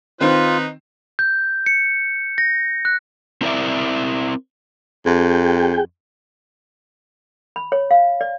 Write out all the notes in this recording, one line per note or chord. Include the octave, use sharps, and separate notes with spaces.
D#3 C4 D#4 F4 B4
G6
C#7
A#6
F#6
C4 E4 A#4 B4 D5 E5
F2 G#4 G5
B5
C#5
F5
D5